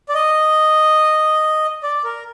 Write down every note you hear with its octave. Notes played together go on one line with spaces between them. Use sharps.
D5
D#5
D5
A#4